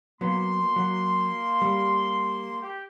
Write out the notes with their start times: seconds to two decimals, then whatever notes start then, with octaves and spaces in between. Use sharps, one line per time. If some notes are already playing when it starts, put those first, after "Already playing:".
0.21 F#3 A#3 B3 C6
0.76 F#3
1.62 G3
2.62 G4